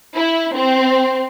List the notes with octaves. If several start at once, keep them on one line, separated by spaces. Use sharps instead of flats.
E4
C4